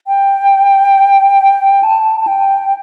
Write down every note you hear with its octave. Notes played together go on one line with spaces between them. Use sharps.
G5
A5
A5
G5